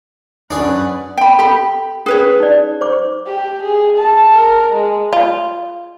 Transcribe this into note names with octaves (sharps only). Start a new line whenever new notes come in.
F#2 C#4 D4 G#4 B4 D5 F#5
G5 B5
G4 A4 B5
C#4 G#4 B4 C#5
D#4 D5
C5 D6
G4
G#4
A5
A#4
G#3
F4